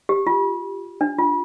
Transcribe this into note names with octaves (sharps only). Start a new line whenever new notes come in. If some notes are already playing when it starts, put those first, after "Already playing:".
G4
F4
D4
F4